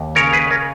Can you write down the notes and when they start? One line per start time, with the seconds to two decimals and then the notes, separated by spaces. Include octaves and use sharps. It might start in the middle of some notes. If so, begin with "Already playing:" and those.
Already playing: D#2
0.15 C#3 A#4 C#5
0.32 G#4 B4
0.50 A#4 C#5